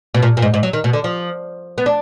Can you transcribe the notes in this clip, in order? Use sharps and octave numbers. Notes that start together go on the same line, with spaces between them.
B2
A#2
A#2
G#2
G#2
F#3
D#3
B2
D3
F3
B3
D4